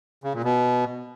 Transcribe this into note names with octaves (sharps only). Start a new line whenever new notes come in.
C#3
A#2
B2